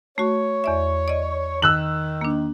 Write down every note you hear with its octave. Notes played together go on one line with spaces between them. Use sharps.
A3 F#4 C#5
E2 D5 E5
D5 D#5
D#3 E6 F#6 F#7
A#3 D4